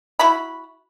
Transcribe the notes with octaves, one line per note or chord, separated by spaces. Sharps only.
E4 F#4 B5